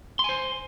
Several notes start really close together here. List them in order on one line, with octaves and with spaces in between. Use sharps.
C6 G#5 C5